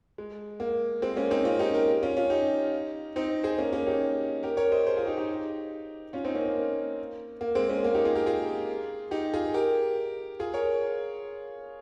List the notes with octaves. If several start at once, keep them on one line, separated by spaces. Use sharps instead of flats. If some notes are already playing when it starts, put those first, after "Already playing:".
G#3
A#3
G#3 C4
A#3 C#4
C4 D#4
C#4 F4
D#4 G4
G4 A#4
C#4 F4
C#4 F4
D#4 G4
C4 D#4
G#4 C5
A#3 C#4
A#3 C#4
D#4 G4
G4 A#4
A#4 C#5
C5 D#5
G#4 C5
F4 G#4
D#4 G4
D#4 G4
C#4 F4
C4 D#4
A#3 C#4
A#3
A#3
G#3 C4
A#3 C#4
A#3
D#4 G4
F4 G#4
G4 A#4
F4 G#4
D#4 G4
F4 G#4
G4 A#4
F4 G#4
A#4 C#5